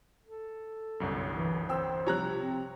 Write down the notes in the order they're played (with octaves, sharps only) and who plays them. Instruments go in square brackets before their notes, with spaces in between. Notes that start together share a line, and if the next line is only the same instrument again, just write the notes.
[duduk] A4
[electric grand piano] G1 C2 F#2
[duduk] E3
[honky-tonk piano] C4 G5 E6 [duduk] C5
[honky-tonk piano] C3 F3 G3 [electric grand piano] C#5 A#5 F#6
[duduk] C4